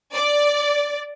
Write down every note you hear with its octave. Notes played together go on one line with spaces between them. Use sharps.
D5